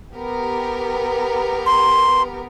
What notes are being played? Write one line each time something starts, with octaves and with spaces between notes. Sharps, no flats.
B3 G4 A#4
C6